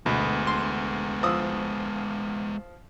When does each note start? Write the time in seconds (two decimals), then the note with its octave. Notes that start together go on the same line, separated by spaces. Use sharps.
0.06 D2 B2 G#3 B3
0.47 C6
1.23 F3 D#6 E6